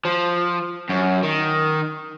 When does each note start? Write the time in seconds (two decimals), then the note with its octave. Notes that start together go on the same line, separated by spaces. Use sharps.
0.05 F3
0.89 F#2
1.23 D#3